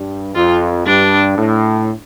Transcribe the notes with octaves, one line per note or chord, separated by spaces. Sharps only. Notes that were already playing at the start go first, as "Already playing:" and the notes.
Already playing: G2
F2 F4
G2 D4
A2